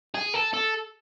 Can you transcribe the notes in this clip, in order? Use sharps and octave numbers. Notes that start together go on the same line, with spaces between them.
G#4
A4
A4